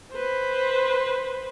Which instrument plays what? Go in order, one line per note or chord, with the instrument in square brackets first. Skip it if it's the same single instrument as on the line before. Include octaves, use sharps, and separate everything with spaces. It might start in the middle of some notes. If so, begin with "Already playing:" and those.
[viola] B4 C5